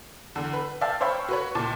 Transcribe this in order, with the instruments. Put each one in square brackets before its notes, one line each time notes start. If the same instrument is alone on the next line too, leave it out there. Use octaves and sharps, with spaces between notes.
[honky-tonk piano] E2 D3
B4
D5 E5 F5 G5 A5
C5 C#5 E5 F5 G5 B5
F#4 B4 C#5
C#2 A#2 A5 D6